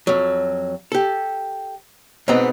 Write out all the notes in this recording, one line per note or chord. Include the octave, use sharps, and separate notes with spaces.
F2 F#3
G4 A4
G#2 B2 B3 C4 D#5 A#5